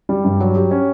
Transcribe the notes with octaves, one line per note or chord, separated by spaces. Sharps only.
G3
G2
F#3
G4
C#4